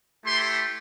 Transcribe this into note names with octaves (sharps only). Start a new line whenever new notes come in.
A3 E4 G4 C6